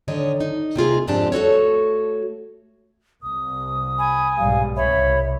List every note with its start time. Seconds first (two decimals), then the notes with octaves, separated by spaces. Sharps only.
0.08 D3 D#3 C#5 D#5
0.40 D#4
0.76 C3 A#3 F4 G#4
1.07 F2 G#2 C4 D4 G4 A5
1.32 A3 F#4 A4 C#5
3.23 C2 D#6
3.99 G#5 B5
4.38 B1 G#2 G3 F5
4.77 C2 C#5 E5 B5